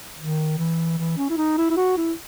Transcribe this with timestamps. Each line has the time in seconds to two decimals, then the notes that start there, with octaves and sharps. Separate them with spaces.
0.19 D#3
0.58 E3
0.98 E3
1.17 C#4
1.30 E4
1.37 D#4
1.58 E4
1.70 E4
1.77 F#4
1.97 E4